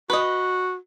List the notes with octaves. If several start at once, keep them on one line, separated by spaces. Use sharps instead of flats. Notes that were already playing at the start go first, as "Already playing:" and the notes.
F#4 B4 D#5